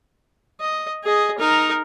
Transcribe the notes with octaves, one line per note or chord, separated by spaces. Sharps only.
D#5
G#4 D#5
D#4 A#4